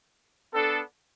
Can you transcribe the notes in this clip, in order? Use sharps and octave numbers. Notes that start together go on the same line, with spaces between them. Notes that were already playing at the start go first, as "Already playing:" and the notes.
B3 D4 A4